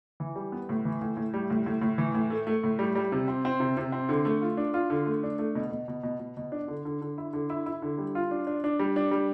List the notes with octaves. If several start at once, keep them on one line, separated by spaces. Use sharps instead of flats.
E3
G3
B3
A2
E3
A2
A2
G3
A2
A2
A2
E3
A2
A3
A3
A2
G3
G3
C3
C4
C4
C3
C3
C4
D3
A3
F4
D4
F4
D3
A3
D4
A3
B2
B2
B2
B2
B2
B2
D4
D3
D3
D3
E4
D3
E4
E4
D3
G3
F4
D4
D4
D4
G3
D4
G3